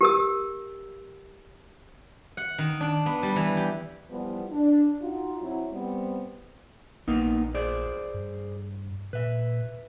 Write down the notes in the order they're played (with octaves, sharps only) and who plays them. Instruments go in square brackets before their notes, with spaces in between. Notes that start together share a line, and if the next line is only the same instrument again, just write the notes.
[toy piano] G4 A#4 E6
[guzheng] F#5
D#3
D4
B3
G3
E3
G4
[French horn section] E3 F3 G3 B3
D4
D#4 F4 F#4
F#3 C4 E4
G3 B3 C4
[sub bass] A#1 [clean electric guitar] A#3 B3 D#4
[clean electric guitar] G#4 C5 D5
[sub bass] G2
[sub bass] A#2 [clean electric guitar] B4 E5